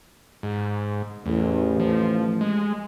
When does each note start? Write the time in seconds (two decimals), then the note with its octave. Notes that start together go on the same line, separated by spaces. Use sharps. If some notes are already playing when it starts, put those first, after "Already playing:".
0.43 G#2
1.26 A1 E2
1.80 F3
2.41 G#3